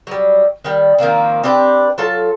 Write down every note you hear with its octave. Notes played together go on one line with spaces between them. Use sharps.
F#3 G3
D#3 G3
D#3 F3 A#3 C4
C4 D4 G4 B4
F#3 F4 A4 A5